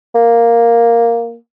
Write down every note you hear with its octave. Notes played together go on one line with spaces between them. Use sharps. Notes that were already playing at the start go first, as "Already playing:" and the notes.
A#3